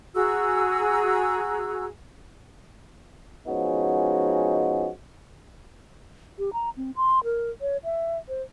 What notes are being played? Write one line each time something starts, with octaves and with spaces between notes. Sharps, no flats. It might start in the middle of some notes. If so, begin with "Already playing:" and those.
F#4 G#4 A#5 E6
F3 G#3 B3 C#4 D#4 F#4
G4
A#5
C4
C6
A#4
C#5
E5
C5